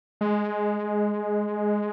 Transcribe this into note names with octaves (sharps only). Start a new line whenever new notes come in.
G#3